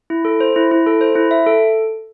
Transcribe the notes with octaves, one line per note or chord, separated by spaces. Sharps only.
E4
A4
C5
E4
E4
A4
C5
E4
E5
A4